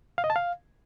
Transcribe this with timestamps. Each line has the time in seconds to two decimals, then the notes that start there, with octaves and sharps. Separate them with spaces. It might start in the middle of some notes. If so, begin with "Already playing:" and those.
0.18 F5
0.24 D#5
0.30 A5
0.36 F5